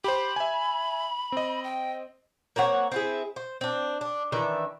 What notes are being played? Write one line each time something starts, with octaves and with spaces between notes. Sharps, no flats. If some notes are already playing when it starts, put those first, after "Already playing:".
G4 C5 B5
E5 G#5
C4 D#5
G5
A#3 C4 C#5 F#5
C4 E4 G#4
C5
C4 D4
D4
D#3 E3 D4 E5